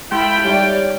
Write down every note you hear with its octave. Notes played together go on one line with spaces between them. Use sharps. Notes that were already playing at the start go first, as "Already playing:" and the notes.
G#3 A3 E4 F5 G5 B5 C6
G3 D#4 G4 C#5 D5 E5